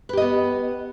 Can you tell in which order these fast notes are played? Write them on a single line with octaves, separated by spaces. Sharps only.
B4 G4 D#5 B3